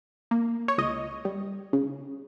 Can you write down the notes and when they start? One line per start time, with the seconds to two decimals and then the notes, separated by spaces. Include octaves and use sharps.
0.31 A#3
0.68 C#5
0.78 C#2 D#5
1.25 G3
1.73 C#3